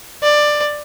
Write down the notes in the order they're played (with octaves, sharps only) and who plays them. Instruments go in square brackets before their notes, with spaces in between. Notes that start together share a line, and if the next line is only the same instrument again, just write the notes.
[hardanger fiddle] D5